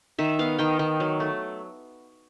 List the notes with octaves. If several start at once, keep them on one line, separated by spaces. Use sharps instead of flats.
D#3 E5
B3 F5
D#3 G5
D#3
F#3
A3